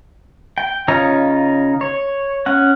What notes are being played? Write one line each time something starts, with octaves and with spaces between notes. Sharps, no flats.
G5
C#3 D#4 F4 C#5 A#5
C#5
C#4 F#5